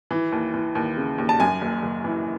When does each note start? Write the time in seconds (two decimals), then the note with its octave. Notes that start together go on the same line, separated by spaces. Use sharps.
0.11 E3
0.32 D#2
0.54 E3
0.75 D#2
0.97 C#3
1.18 D#2
1.29 A5
1.40 F#2 G#5
1.61 F#1
1.82 F#1
2.04 E3